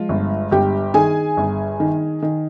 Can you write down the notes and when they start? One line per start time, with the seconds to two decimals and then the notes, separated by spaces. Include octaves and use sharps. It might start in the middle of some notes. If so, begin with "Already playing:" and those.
Already playing: F3 G#3 F4
0.09 G1
0.51 G1 G4 G5
0.94 D#3 G#4 G#5
1.37 G1
1.80 D#3
2.22 D#3